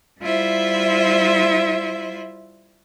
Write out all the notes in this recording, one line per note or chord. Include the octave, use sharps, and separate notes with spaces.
G3 E4 F4 C5 E5